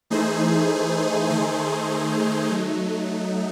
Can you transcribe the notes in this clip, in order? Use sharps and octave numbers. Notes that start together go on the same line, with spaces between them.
E3 A3 D#4 G#4 C5
D#3 A3 D#4 G#4 C5
F#3 A3 D#4